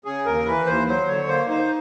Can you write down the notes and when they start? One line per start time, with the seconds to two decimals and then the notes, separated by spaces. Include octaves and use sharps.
0.05 C#3 G#4
0.26 D#2 A#4
0.46 E3 B4
0.66 D#2 C5
0.88 F#3 C5
1.08 D3 C#5
1.28 A#3 C5
1.49 D#4 C5